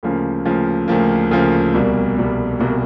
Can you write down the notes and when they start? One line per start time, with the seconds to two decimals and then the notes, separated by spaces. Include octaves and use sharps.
0.03 D2 C#3 F3 A#3
0.45 D2 C#3 F3 A#3
0.88 D2 C#3 F3 A#3
1.31 D2 C#3 F3 A#3
1.74 C2 B2 G3 A#3
2.16 C2 B2 G3 A#3
2.59 C2 B2 G3 A#3